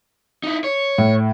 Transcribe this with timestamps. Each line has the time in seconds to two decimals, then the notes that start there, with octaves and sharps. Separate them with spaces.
0.43 D#4 E4
0.64 C#5
0.98 A2